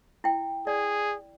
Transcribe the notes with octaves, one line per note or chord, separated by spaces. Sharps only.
E4 G5
G#4 D5